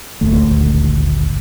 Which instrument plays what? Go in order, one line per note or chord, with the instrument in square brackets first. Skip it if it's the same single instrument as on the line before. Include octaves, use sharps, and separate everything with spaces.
[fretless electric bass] D#1 G#1 D2 A3